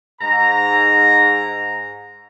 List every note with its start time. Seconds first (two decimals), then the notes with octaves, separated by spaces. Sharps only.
0.21 G#2 A#5